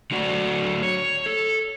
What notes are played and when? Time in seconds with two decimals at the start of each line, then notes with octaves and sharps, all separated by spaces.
0.11 D3 F#3 A3 F#4 D5
0.83 C#5
1.26 A4